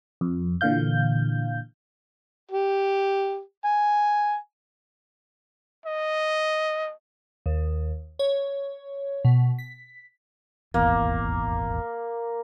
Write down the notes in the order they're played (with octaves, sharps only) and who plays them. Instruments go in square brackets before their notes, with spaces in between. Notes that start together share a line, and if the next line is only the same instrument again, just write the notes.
[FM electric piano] F2
A#2 D3 E3 F5 G6
[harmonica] G4
G#5
[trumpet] D#5
[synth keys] D#2
C#5
B2
B6
[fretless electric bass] D#1 G#1 E2 [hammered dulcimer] A#3